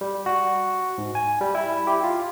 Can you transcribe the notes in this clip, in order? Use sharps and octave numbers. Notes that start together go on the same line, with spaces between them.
G3
F#4
G#2
G#5
G3
E4
G4
F4